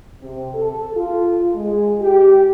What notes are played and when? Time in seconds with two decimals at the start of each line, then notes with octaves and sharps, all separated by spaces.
0.21 C3
0.54 A4
0.96 F4
1.55 G#3
2.01 G4